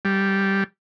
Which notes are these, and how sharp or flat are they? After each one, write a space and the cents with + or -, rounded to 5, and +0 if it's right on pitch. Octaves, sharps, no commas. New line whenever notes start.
G3 -5